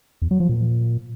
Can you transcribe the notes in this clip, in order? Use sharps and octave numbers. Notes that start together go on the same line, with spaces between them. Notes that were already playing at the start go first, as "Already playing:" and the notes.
E2
F#3
F3
A#2